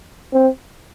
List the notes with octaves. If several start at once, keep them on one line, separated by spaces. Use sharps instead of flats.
C4